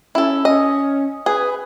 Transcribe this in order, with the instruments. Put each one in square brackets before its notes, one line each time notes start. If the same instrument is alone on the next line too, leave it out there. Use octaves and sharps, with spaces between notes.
[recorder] C#4 [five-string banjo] E4 A4
[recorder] C#4 [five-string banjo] D#5
[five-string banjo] G#4 [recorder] B4